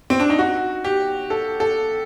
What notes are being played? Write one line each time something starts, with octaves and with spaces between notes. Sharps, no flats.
C4
D4
D#4
F#4
G4
A4
A4